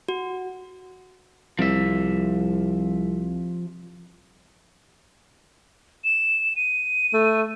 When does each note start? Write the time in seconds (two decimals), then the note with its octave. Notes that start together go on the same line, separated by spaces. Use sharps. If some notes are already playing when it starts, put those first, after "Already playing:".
0.08 F#4
1.59 C2 F3 E5
6.04 E7
6.56 D#7
7.14 A3